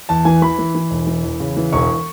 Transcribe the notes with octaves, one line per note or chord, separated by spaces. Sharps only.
E2 A5
E3 G#5
E3 B5
E3
E3
E1
E3
E2
C#3
E3
E1 C#6